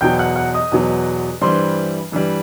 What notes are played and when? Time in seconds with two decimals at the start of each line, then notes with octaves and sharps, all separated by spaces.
0.01 E2 B2 F#3 G5 G6
0.19 F#5 F#6
0.36 F#5 F#6
0.54 D#5 D#6
0.72 E2 B2 F#3
1.41 G2 E3 G3 C5 C6
2.12 G2 E3 G3